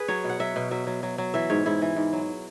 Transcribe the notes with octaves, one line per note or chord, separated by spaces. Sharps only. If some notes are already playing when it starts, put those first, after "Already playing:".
Already playing: G#4 B4
F#3 C#5
B2
F#5
F#3 E5
B2
F#3 E5
F#3
F#3
F#3
E3 E5
G#2 C#5
G#2 E4
E3
G#2
F#3